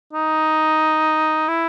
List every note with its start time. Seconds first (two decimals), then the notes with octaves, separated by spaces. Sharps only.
0.13 D#4
1.48 E4